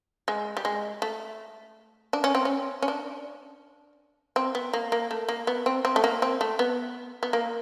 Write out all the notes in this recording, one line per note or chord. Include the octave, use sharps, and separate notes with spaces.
G#3
G3
G#3
A3
D4
C#4
C4
C#4
C#4
D4
C4
B3
A#3
A#3
A3
A#3
B3
C4
C4
A3
A#3
C4
A3
B3
B3
A#3